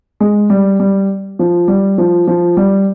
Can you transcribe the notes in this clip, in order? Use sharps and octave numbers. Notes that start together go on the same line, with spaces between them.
G#3
G3
G3
F3
G3
F3
F3
G3